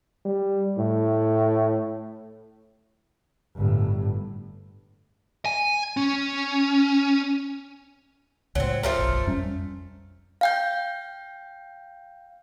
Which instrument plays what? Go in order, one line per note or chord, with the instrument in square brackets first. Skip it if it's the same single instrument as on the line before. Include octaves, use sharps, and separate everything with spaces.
[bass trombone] G3
A2
[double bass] G1 A2
[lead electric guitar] G#5
C#4
[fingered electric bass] C#2 A2 [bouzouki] F#3 C4
[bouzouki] F3 A3 A#4
[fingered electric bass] F#1 B1
F2 G3 C#4
[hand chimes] F5 G5 G6